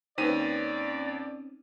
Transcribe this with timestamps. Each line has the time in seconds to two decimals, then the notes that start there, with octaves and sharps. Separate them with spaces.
0.18 D#2 C4 C#4 D#4 B4 D5 D#7